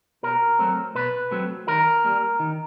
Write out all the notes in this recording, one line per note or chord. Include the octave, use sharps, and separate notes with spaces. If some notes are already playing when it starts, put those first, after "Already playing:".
B2 A#4
F#3 A3 C4
B2 B4
F#3 A3 C4
D#3 A#4
G3 A#3
D#3